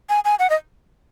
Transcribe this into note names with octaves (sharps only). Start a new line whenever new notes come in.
G#5
G#5
F#5
D#5